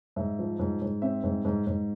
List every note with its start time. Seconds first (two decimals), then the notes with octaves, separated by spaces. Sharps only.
0.16 G#2 E5
0.39 F3
0.59 G#2
0.82 G#2
1.02 C4 E5
1.24 G#2
1.45 G#2
1.67 G#2